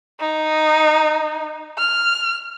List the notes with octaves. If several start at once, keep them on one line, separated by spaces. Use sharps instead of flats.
D#4
F6